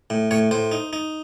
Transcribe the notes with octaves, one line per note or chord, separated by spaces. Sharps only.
A2
A2 C#5
A2 C5
D#4
D#4